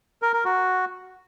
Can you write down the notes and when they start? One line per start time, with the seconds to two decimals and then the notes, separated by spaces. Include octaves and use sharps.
0.22 A#4
0.33 A#4
0.45 F#4